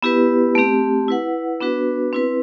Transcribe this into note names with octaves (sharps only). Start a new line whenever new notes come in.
B3 E4 G4 B4
A3 C4 G4
E4 B4 F#5
B3 D4 F#4 B4
C4 E4 B4